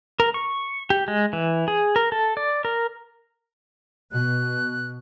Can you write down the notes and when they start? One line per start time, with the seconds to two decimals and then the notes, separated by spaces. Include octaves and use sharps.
0.20 A#4
0.34 C#6
0.90 G4
1.08 G#3
1.33 E3
1.68 G#4
1.96 A#4
2.12 A4
2.37 D5
2.65 A#4
4.12 B2 F#6